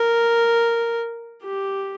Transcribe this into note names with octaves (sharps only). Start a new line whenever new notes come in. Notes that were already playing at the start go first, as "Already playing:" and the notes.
Already playing: A#4
G4